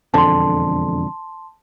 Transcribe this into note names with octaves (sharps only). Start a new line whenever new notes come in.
E1 F2 D3 A5 C6